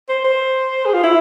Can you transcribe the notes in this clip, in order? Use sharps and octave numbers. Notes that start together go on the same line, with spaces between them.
C5
C5
G#4
F4
E4